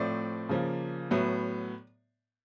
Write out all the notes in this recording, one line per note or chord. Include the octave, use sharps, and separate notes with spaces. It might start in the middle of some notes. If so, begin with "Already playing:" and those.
Already playing: A2 F3 A3 C4 D5
C#3 F3 A#3
A2 F#3 B3